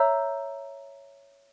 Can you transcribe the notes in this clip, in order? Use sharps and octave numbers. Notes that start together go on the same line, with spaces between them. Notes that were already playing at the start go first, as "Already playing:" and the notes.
Already playing: C#5 E5 A#5 E6 G6